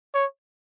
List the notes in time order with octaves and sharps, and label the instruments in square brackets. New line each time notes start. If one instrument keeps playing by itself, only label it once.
[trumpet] C#5